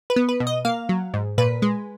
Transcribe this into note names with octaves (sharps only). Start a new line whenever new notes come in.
B4
B3
B4
B2
D#5
A#3 F5
F#3
G#2
A#2 B4
G#3